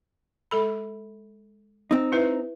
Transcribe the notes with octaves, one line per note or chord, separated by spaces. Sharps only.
G#3 A4 B5
C4 D#4
E4 B4 E5